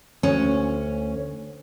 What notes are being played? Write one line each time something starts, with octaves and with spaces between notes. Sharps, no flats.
D2 C#4